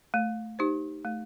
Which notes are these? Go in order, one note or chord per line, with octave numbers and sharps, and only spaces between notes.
A3
D#4 G4 C5
A3